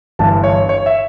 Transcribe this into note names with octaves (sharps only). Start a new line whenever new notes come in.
G1 G2 E3 A5
C#5
C#5
E5